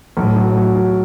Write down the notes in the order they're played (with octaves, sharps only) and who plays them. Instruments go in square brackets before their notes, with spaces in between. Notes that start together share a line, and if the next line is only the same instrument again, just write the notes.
[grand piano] B1 [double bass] A2
[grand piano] F#3
F#3
F#3